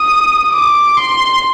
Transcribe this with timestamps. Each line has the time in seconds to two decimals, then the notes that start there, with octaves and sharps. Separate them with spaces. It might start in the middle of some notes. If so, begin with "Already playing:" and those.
Already playing: D#6
0.53 D6
0.97 C6